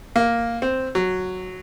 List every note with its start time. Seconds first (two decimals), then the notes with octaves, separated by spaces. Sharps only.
0.16 A#3
0.62 C4
0.95 F#3